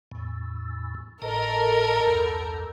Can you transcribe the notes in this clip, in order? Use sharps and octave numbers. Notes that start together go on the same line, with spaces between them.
E2 A2
G#1 A2 A4 A#4 D#5
B1 E2 G2